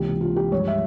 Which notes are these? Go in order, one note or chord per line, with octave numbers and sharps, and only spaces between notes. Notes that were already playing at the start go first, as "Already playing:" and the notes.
Already playing: C#2 C3 E3 A#3 G4
F4
G4
G2 F3 G#3 C#5
E5